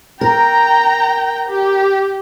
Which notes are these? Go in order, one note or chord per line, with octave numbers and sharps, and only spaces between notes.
A#4 G5 A#5
G4